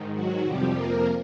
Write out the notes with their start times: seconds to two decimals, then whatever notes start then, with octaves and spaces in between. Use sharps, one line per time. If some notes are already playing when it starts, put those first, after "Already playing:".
Already playing: G#2 D#3
0.14 F#3 F#4
0.45 F2 C3 F3 G3 G4
0.75 A#3 A#4